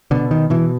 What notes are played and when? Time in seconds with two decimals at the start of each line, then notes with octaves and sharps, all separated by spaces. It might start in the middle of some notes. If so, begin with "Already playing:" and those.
0.11 B2 D3
0.31 D#3
0.50 B2 E3